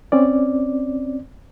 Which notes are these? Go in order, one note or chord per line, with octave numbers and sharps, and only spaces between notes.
C4 C#4 D5